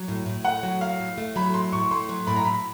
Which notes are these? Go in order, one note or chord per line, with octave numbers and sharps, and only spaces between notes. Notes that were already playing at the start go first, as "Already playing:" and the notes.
Already playing: F#3
A2
A2
A3 F#5
F#3
A2 F5
A2
A3
F#3 B5
A2 C6
A2 C#6
A3 C6
F#3
A2 B5
A#5
A2 B5